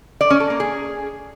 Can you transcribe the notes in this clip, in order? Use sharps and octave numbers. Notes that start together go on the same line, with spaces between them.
D5
C#4
A4
A#3
G#4